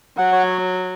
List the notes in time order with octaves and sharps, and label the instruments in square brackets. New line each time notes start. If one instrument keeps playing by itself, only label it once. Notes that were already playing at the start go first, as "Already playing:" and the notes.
[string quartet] F#3 [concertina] F#5
[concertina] C#5